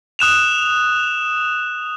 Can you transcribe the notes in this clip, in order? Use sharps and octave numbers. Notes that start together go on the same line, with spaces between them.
D#6 F#6 E7 F7